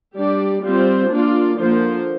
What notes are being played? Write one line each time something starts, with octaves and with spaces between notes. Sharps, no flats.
G3 D4 G4 D5
G3 C4 F4 C5
A#3 D4 F4 D5
D3 F3 A#3 F4 C5